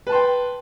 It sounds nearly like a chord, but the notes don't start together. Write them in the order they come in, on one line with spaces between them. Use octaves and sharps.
B4 A5 C6 G5